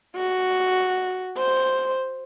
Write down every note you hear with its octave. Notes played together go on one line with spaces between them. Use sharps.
F#4
C5